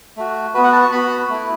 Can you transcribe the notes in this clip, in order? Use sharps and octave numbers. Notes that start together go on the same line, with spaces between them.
A3 F#4
B3 F#4 B4
F#5
A5
C#6
B3 F#4 B5
A3 E4